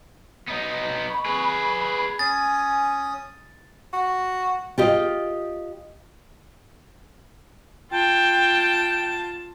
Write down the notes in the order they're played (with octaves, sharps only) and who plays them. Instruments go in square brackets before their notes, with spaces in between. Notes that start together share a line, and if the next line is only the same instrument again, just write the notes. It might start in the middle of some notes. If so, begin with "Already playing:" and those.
[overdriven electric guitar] B3 D#4
[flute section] B5 C#6
[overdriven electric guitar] G#4 B4
[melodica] C#4 D#6 [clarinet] G#5 [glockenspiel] A6
[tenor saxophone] F#4
[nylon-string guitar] F4 G4 D#5
[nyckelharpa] F4 A5 [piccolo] G5